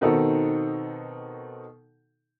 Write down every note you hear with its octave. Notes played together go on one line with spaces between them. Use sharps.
B2 D#3 C4 D#4 F#4 A4